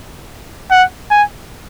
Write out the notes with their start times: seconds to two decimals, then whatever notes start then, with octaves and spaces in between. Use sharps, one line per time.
0.71 F#5
1.11 G#5